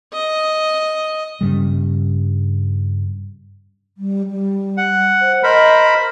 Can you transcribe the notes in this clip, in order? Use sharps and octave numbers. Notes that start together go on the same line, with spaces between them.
D#5
G2 C#3 G3
G3
G3
F#5
C5
A#4 C5 D#5 B5